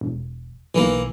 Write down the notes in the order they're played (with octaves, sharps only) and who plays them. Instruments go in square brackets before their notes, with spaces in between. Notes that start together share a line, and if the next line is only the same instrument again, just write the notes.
[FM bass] E1
[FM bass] B1 [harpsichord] E3 A#3